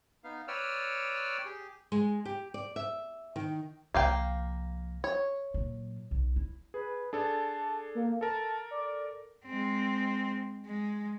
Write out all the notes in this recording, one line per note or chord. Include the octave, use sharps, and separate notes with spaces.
B3 D#4 F5
B4 C#5 D5 G5 E6 F6
G4 G#4
G#3
G4
D5
E5
D#3
C2 F3 A#3 F5 G5
C#5
A#2 F#3
B1
E4
G#4 B4
D4 G#4 A4 A5
A#3
A4 A#4 A5
D5
G#3 C4
G#3